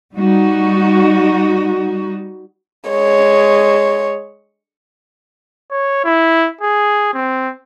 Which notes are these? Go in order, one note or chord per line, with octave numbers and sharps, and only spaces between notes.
G3 D#4 F#4
G#3 C#5
C#5
E4
G#4
C4